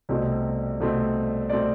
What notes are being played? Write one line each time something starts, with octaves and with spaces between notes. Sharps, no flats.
C2 B2 A3 C4
C2 B2 A3 C4
B2 A3 C4 D5